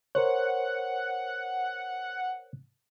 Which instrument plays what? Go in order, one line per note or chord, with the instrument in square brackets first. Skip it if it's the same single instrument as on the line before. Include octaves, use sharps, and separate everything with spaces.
[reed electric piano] A#4 C5 C#5 [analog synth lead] F#5